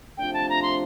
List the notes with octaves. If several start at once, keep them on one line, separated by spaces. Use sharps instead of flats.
C3 F3 A3 D4 F4 G5
A5
A#5
C6